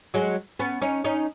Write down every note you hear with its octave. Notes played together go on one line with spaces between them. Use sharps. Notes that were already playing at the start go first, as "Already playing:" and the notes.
F#3 G#3
B3 C#4
C#4 D#4
C#4 D#4